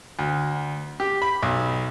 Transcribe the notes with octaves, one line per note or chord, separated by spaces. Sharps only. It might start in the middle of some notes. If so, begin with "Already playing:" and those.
D2
G4
B5
B1